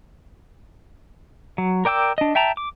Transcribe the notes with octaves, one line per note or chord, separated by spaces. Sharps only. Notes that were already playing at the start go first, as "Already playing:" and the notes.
F#3
A#4 D5 G5 D6 E6
D4 D#5
E5 G5 A5 A#5
D6